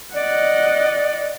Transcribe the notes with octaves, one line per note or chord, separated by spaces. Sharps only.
D5 D#5 F#5